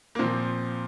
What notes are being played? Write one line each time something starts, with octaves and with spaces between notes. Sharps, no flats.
A#3
A#2 F3 C4